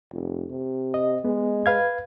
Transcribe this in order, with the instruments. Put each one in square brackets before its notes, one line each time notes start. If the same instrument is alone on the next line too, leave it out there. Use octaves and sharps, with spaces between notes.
[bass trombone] F1
C3
[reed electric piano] D#5
[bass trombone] G#3 [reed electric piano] B3
[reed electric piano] B4 F5 G#6